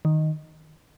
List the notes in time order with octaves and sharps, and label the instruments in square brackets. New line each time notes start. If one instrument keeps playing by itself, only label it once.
[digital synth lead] D#3